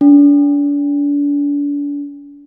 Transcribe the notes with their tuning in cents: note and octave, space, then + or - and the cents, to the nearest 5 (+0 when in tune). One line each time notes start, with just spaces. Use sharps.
D4 -35